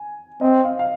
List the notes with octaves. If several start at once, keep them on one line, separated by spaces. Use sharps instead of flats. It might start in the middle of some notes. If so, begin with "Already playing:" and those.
Already playing: G#5
C4 D#5
F5
F5